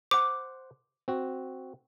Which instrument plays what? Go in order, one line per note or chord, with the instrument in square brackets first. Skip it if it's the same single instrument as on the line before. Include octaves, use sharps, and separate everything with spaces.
[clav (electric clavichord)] C5 F#5 [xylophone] D6
[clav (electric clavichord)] C4 F#4